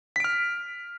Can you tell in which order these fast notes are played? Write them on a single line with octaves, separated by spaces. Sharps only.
B6 D7 F6